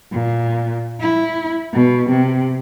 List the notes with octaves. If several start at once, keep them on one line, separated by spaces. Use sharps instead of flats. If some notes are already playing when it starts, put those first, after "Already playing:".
A#2
E4
B2
C3